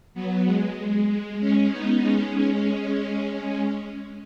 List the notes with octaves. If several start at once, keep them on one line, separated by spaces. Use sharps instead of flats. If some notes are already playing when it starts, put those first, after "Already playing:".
F#3 B3
G#3
G#3
G#3 C#4
B3 D#4
G#3 C#4
G#3 C#4
G#3 C#4